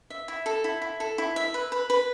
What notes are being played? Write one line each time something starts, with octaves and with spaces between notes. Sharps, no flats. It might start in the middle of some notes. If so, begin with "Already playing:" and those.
E5
E4
A4
E4
E4
A4
E4
E5
B4
B4
B4